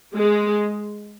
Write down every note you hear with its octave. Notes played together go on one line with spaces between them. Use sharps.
G#3